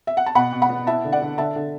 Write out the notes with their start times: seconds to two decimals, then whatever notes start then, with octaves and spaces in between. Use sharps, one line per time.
0.07 E5
0.17 F#5
0.26 A5
0.35 B2 F#5 B5
0.53 B2
0.62 F#5 B5
0.69 B3
0.87 E4 E5 A5
1.05 D3
1.12 D5 F#5
1.22 D3
1.38 D3 E5 A5
1.56 D3